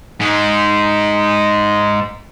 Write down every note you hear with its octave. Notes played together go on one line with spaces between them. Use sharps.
G#2 G#3